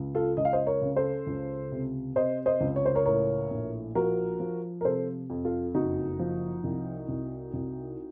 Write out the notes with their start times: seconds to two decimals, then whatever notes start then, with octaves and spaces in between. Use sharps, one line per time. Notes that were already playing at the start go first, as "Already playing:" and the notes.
Already playing: C#2
0.15 F4 A4
0.37 C#2 D#5
0.45 F5
0.53 C5 D#5
0.66 A#4 C#5
0.82 C#3
0.96 A4 C5
1.27 C#2
1.72 C3
2.16 C3 C5 D#5
2.46 C5 D#5
2.61 C#2
2.76 C#5
2.86 C5
2.95 A#4 C#5
3.06 A2 A#4 C#5
3.51 A#1
3.95 F3 F#4 A#4
4.40 F3
4.81 A#4
4.85 C3 A4 C5
5.30 F2
5.45 F4 A4
5.75 F#1 D#4 F#4
6.19 F3
6.64 C2
7.09 C2
7.54 C2